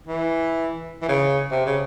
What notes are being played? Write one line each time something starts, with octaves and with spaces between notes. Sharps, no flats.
E3
E3
C#3
C3
C#3